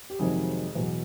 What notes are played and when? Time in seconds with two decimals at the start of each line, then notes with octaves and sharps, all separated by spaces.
0.10 G4
0.19 F2 C3 D#3 F#3 G#3 G#4
0.75 E2 B2 F#3